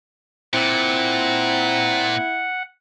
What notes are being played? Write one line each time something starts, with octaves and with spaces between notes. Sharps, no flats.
A#2 C4 E4 F#5